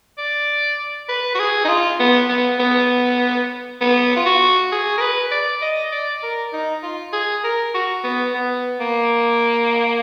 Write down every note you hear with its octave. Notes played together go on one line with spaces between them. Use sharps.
D5
B4
F#4
G#4
D#4
F4
B3
B3
B3
B3
F4
F#4
G#4
A#4
B4
D5
D#5
D5
A#4
D#4
F4
G#4
A#4
F#4
B3
B3
A#3